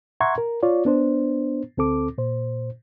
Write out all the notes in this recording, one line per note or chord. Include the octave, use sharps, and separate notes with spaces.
E5 F#5 A#5 C6 C#6 G#6
A#4
F4 C#5 D5
B3 D4 C5
D2 C4 A4 D6
A#2 C5